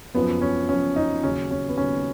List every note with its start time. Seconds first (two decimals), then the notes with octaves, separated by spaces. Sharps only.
0.14 F#1 F#2 F3 B3
0.42 C#4
0.69 F#1 F#2 F3 C#4
0.96 D#4
1.23 D#2 C#3 F#3 C#4
1.51 C#4
1.69 B3
1.77 D#2 C#3 F#3 C#4